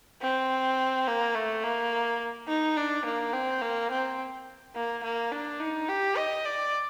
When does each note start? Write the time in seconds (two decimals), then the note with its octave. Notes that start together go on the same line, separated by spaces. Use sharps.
0.22 C4
1.07 A#3
1.35 A3
1.64 A#3
2.48 D#4
2.77 D4
3.05 A#3
3.33 C4
3.61 A#3
3.91 C4
4.75 A#3
5.03 A#3
5.32 D4
5.60 D#4
5.88 G4
6.17 D#5
6.45 D5